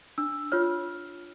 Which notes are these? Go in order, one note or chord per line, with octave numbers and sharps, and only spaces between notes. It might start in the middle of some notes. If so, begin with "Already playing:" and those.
D4 E6
F4 C#5 F6